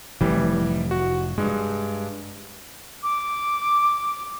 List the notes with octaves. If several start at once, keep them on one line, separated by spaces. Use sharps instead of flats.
F1 A2 E3 G3
F#4
G2 G#3
D6